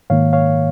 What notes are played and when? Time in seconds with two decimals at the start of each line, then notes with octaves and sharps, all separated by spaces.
0.10 G#2 D#3 A#3 C#5 F5
0.33 C#5 F5